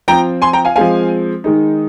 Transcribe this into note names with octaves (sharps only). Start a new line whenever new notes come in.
F3 C4 F4 G5 A#5
G#5 C6
G5 A#5
F5 G#5
F3 G#3 C4 F5 G#5
D#3 G#3 D#4